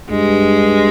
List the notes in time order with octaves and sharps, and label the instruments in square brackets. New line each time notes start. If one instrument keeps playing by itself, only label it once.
[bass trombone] G2 [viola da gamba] G#3